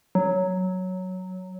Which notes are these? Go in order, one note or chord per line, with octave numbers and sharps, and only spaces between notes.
F#3